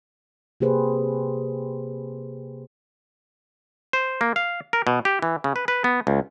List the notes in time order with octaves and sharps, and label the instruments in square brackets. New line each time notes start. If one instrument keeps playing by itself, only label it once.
[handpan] C3 A#3 G4 G#4 B4 C5
[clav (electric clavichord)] C5
A#3
F5
A#4
B2
G4
E3
C#3
B4
B4
B3
C#2